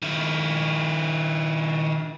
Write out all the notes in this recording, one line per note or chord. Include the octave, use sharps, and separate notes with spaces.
D#3 E4